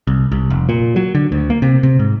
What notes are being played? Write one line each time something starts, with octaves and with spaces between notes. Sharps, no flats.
C2
C2
F1
A#2
F#3
D3
D2
A#3
C3
C3
G#2